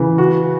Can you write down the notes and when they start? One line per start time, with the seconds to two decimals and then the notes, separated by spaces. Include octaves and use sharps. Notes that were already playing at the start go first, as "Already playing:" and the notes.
Already playing: C#3 E3
0.18 F#4